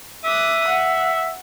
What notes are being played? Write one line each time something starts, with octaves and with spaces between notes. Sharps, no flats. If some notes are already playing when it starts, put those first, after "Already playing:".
E5 D6 D#6 F#6
F#5